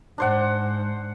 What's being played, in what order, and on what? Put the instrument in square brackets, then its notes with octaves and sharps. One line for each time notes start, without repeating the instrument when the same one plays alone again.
[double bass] G#2 [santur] D4 C5 F#5